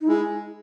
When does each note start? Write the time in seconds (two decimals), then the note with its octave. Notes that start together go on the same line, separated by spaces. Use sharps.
0.01 D#4
0.08 G#3 E4